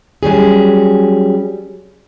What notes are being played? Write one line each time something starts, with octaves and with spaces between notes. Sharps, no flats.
F#3 G3 C#4 G#4